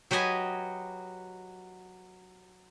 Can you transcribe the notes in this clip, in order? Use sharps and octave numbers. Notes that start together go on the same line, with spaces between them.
F#3 G4 B4 D#5 G#5